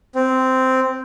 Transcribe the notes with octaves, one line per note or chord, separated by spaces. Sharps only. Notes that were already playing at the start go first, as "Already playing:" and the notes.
C4